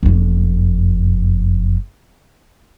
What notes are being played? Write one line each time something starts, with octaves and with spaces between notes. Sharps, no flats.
F#1 F2